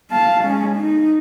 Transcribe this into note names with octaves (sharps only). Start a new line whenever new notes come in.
F5 A5
G#3 C#4
D#4